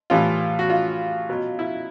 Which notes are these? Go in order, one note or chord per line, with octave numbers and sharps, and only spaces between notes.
A2 E3 G3 F4
F#4
F4
B2 F#3
E4